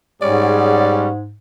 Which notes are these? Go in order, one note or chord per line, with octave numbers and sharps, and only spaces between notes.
G#2 G3 G#3 C#4 G#4 C#5 D5 F#5